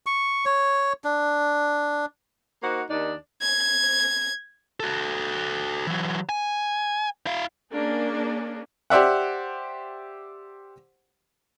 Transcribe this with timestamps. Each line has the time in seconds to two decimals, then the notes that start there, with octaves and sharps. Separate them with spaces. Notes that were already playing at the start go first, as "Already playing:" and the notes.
0.06 C#6
0.45 C#5
1.04 D4
2.62 A#3 D#4 F#4 C5 F#5
2.90 D#2 D#3 D4 D#4
3.42 G#6
4.80 F#4 A4
5.87 E3 F#3
6.29 G#5
7.26 E4 F5
7.72 A#3 C#4 D4 G#4
8.90 G4 C5 D5 E5 F#5